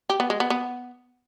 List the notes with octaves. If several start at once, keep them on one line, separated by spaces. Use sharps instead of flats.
G4
B3
G#3
B3
B3